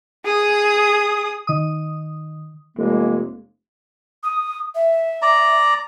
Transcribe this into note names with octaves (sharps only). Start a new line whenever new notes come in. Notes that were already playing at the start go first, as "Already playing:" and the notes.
G#4 D#6
D#3 D#6
F1 G#3 A#3
D#6
E5
D5 A#5